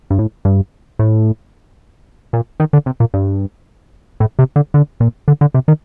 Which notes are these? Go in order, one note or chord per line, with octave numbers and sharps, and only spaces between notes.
G2
A2
G2
A2
A#2
D#3
D3
C3
A#2
G2
A2
C3
D3
D3
A#2
D3
D3
C3
D#3